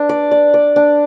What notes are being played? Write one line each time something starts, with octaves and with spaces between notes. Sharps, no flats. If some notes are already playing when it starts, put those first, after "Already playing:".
Already playing: D4
D5
D5
D5
D4